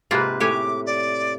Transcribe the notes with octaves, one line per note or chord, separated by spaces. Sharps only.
G#2 C3 G#3 A#3 F4 B4
A2 G4 C#5 G#5 D6
D5